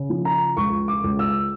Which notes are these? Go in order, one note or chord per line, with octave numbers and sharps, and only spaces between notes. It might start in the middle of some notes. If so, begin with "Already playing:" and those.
Already playing: C#3
F3
A#5
C#2 C#6
D6
C#2
E6